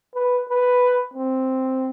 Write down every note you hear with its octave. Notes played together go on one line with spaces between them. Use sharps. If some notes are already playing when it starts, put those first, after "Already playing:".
B4
B4
C4